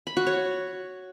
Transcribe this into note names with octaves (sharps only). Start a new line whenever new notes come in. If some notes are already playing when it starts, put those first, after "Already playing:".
B5
F#4
C#5